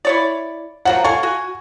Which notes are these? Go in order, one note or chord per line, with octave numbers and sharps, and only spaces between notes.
E4 C#5 D5
F3 F#3 A#3 F#5
A4 F5 G#5 C#6
F#4 G#5